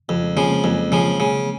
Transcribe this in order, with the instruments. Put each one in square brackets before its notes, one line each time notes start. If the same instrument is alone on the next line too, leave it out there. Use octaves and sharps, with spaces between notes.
[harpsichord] F2 [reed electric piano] C#3 F3
[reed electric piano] G#3 C4
[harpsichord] C#3 F3 [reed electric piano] A#3 C#4
[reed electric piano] G#3 C4
[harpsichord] F2 [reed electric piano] F#3 A#3
[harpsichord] C#3 F3
C#3